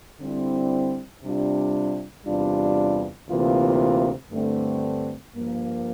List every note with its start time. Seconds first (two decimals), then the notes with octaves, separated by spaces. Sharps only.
0.20 D3 G3 C4 E4
1.23 C3 G3 D4 F4
2.26 E2 C3 G3 D4 F4
3.28 D2 C3 E3 A#3 F4
4.31 G2 D3 A3 C4
5.35 G2 F3 A#3